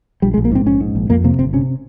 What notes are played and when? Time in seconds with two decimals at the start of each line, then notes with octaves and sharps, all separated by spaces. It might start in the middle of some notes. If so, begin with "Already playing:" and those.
0.22 A#1 G3
0.34 G#3
0.38 A#1
0.45 A#3
0.52 G#2 C4
0.66 A#1 C#4
0.81 G#2
0.95 A#1
1.10 F2 A#3
1.24 C3 A#3
1.39 G1 C4
1.53 C3 C#4